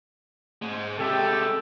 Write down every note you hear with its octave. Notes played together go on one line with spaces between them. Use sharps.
G#2 G#3
C3 G#3 G4 A4